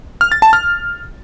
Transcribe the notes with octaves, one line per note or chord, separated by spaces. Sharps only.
F6
A6
A5
F6